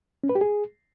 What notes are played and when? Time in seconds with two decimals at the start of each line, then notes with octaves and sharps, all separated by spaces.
0.24 C#4
0.29 B4
0.35 G4
0.41 G#4